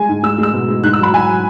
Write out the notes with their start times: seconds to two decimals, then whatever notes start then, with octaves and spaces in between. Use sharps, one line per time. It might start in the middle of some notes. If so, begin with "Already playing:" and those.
Already playing: G#3 G#5
0.09 G#2
0.23 G#3 E6
0.38 G#3 E6
0.53 B2
0.68 G#3
0.84 G#2 F#6
0.93 E6
0.99 F#3 B5
1.13 F#3 G#5